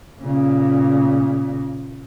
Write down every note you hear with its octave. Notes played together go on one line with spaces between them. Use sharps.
A#2 C#3